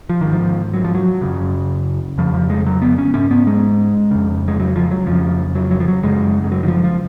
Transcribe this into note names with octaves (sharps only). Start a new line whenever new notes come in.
F3
G#2 D#3
F3
F#3
F3
F#3
F#2 C#3
F2 C#3 F3
F3
G#3
F#3
B3
C#4
G#2 C#4
B3
G#3
F2 C#3
G#3
F#3
F3
F#3
F2 C#3 F3
F#3
F#3
F3
F#3
F#2 C#3 G#3
G#3
F#3
D#3
F3
F3